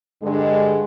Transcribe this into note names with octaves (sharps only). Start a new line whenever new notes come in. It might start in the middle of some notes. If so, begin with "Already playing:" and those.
G2 D3 G#3